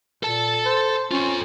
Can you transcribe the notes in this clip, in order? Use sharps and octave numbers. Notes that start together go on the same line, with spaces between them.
A#2 A4 A5
C5
C#4 F4 A4